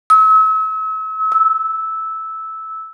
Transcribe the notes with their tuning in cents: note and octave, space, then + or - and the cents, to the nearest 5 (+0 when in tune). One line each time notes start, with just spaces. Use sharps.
E6 -40
E6 -10